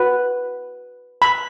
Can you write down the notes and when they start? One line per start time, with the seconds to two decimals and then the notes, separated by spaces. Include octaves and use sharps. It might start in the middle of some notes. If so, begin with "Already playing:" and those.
Already playing: F#4 B4
1.22 B5